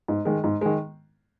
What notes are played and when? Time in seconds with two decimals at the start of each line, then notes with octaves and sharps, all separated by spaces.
0.08 G#2
0.25 D#3 G#3
0.44 G#2
0.61 D#3 G#3